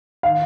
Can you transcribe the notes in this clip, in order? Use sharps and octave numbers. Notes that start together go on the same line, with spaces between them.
D#3 F5